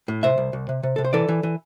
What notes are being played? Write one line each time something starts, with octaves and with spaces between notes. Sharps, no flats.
A2
C3 C5 E5
C2
C2
C3
C3
C3 A4
C5
E3 A4 D5
E3
E3